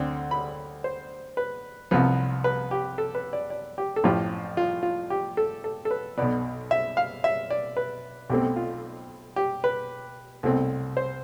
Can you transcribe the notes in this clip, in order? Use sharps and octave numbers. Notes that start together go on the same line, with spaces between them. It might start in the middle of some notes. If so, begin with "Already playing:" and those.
Already playing: D2 D3 C4
B5
C5
B4
C2 C3 F3 B3
B4
G4
A4
B4
D5
D5
G4
A4
A1 A2 F3 G4
F4
F4
G4
A4
A4
A4
B4
B1 B2 B3 D5
E5
F5
E5
D5
B4
B1 B2 A3 C4 G4
F4
G4
B4
C2 B2 A3 C4
C5